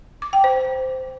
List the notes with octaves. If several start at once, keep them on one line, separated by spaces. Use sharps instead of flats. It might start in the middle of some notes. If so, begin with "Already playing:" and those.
D6
G5
C5